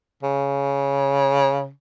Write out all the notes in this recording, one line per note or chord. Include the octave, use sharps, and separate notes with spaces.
C#3